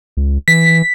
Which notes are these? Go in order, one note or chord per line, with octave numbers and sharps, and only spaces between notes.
C#2
E3 B6